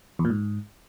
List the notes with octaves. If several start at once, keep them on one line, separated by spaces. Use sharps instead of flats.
E2
A#2
G#2